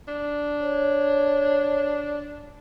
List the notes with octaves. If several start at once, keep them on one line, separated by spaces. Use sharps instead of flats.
D4
C#5